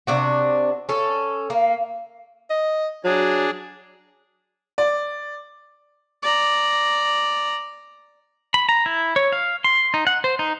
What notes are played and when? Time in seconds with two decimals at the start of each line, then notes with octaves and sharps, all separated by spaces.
0.07 C3 D4 F#4
0.89 C#4 A4
1.50 A#3
2.50 D#5
3.04 F#3 D4 G#4
4.78 D5
6.23 D5 A#5
8.54 B5
8.69 A#5
8.86 E4
9.16 C#5
9.32 F5
9.64 C6
9.94 D#4
10.07 F#5
10.24 C5
10.39 D#4